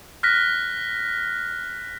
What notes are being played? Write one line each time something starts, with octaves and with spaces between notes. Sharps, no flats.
F6 F#6 A#6 B6